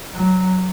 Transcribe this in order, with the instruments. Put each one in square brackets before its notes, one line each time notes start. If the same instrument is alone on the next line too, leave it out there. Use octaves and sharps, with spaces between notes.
[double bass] F#3